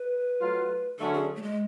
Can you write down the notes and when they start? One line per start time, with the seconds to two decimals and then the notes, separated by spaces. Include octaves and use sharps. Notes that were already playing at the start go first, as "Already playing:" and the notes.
Already playing: B4
0.41 F#3 A3 F4
0.99 D3 F#3 A3 C#4 F#4 A4
1.14 G#4
1.36 A3
1.42 G#3